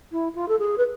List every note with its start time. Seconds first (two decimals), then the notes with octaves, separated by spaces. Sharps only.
0.12 E4
0.35 F4
0.48 A4
0.59 G#4
0.78 B4